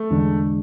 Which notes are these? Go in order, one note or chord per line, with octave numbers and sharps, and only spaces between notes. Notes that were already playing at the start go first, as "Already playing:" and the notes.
Already playing: A3
E2 D3 G#3 D4